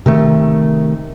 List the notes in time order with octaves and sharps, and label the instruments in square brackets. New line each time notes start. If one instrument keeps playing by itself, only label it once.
[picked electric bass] C3 D#3 A3